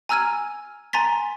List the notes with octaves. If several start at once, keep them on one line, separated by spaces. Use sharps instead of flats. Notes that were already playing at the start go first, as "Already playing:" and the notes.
G#5 A#5 E6 F6 G#6 D#7
G#5 A#5 C6 A6 B6